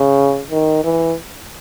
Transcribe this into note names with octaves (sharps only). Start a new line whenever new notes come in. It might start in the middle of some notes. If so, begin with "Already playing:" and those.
Already playing: C#3
D#3
E3